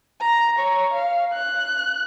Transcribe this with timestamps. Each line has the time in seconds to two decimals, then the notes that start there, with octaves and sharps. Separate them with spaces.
0.21 A#5
0.59 C#5
0.94 F5
1.33 F#6